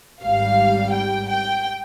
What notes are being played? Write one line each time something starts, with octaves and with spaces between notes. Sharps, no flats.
G#1 G#2 G3 F5
G5
G5